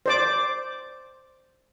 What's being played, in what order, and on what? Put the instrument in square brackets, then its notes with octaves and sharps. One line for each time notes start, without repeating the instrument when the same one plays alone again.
[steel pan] C5 D5 D6